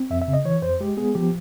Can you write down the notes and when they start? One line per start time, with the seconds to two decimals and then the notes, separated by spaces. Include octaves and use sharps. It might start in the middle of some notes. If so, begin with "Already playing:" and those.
Already playing: C4
0.10 F2 E5
0.22 E5
0.28 C#3
0.33 D#5
0.45 E3 C#5
0.62 F2 C5
0.80 G#3 G4
0.97 B3 G#4
1.15 F3 G4